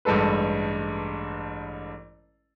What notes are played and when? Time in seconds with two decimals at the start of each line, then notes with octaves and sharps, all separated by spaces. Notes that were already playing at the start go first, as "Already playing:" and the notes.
0.05 A1 G2 G#3 A4 B4